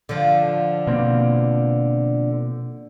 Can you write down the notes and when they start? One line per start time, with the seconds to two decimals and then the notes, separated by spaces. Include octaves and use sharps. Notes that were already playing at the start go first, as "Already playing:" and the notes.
0.09 D3 F3
0.87 B2 A#3 C4